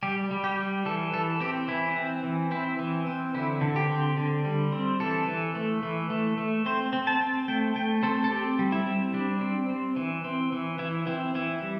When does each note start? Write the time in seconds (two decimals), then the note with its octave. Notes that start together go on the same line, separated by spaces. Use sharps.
0.03 G3 G4
0.31 G3
0.44 G4
0.58 G3
0.86 E3 A4
1.13 E3 A4
1.40 C4 G4
1.68 E3 E4
1.96 C4
2.23 E3
2.51 C4 E4
2.79 E3
3.07 C4
3.34 D3 E4
3.61 D3
3.76 G4
3.89 C4
4.17 D3
4.45 G3
4.72 C4
5.00 E3 A4
5.27 E3
5.55 A3
5.83 E3
6.10 A3
6.38 A3
6.66 C4 C5
6.93 C4
7.07 A5
7.21 C4
7.48 A3 G5
7.76 A3 G5
8.03 C4 A4
8.24 A4
8.31 C4 G4
8.59 G3
8.72 E4
8.86 C4
9.13 G3 D4
9.41 C4
9.69 C4
9.96 E3
10.24 C4
10.52 E3
10.79 E3 E4
11.07 C4 E4
11.35 E3 E4
11.62 G3